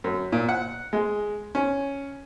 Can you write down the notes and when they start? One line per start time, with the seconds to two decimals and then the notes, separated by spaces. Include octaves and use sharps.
0.04 F#2
0.32 A#2
0.49 F#5
0.93 G#3
1.55 C#4